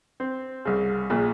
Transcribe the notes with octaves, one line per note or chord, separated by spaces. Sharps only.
C4
C2 C#3
A#1 A#2 C#3